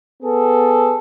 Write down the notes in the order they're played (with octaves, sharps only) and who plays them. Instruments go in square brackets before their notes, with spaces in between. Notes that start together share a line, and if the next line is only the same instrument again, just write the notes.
[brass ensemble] B3 G#4 A4